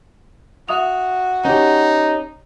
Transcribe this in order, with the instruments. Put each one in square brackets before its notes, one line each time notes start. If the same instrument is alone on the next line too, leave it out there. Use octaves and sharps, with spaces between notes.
[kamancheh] F#4 [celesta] E5 D#6 F7
[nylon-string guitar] C#4 G4 [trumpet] D#4